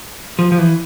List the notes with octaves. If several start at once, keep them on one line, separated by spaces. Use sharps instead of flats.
F3
F3
E3